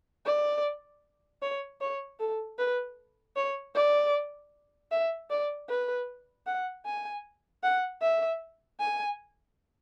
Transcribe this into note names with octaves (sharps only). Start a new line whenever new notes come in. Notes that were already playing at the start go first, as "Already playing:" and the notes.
D5
C#5
C#5
A4
B4
C#5
D5
E5
D5
B4
F#5
G#5
F#5
E5
G#5